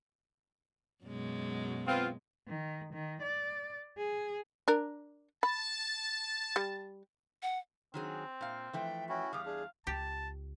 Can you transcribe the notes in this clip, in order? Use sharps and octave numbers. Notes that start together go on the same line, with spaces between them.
F#2 B2 G#3
B3 C4 F4
D#3
D#3
D5
G#4
D4 A#4
A5 B5
G3
F#5
D#3 F#3 C4 G#4
A#2 F5
E3 F3 A3 G5
C#4 E4 F#4 G5
E2 G3 G#4 F5 D6
D4 G#4
C#2 G4 A5